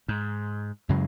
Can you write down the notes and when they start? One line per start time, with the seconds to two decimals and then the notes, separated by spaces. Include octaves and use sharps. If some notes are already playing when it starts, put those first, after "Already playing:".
0.08 G#2
0.89 F#2 C#3 F#3 G#3